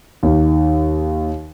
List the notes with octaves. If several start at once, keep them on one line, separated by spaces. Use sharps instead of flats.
D#2 D#3